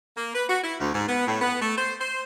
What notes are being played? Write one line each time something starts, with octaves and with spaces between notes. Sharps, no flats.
A#3
B4
F#4
E4
D2
G#2
B3
A2
B3
A3
C5
C5